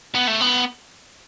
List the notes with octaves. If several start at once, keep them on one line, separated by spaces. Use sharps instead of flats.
B3
A3
B3